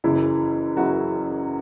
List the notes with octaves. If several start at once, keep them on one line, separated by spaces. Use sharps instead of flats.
F#1 F#2 C#3 E3 E4
F#1 F#2 C#3 E3 F#4